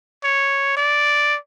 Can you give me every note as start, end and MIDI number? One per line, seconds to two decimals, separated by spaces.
0.24 0.74 73
0.77 1.37 74